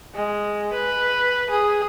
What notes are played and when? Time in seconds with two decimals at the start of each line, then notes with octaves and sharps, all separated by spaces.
0.14 G#3
0.73 B4
1.50 G#4